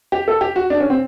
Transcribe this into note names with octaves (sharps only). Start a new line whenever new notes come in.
G4
A4
G4
F#4
D4
C#4
C4